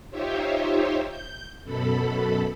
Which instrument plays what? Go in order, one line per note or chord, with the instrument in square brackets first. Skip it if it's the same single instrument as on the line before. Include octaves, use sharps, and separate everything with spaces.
[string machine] D#4 F4 G4 C5 C#5 E5
G6
F#2 B2 A4 B5